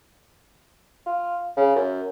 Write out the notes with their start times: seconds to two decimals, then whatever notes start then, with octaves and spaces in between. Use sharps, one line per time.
1.06 F4
1.56 C#3
1.76 F#2